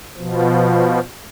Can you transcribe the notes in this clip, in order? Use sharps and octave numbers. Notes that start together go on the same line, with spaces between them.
B2 F3